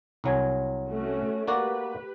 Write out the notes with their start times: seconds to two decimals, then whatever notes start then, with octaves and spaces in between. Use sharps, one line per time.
0.24 C2 F#3 G#5
0.89 A3 C#4 F#4
1.48 A#3 F#4 G4 B4 D5